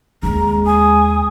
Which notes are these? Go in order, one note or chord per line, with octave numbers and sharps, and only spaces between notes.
D#2 G#3 C#4 A#5
G#5 D#6